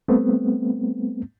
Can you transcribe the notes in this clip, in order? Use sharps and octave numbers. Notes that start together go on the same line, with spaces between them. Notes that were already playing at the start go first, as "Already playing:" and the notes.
G3 A3 B3 C4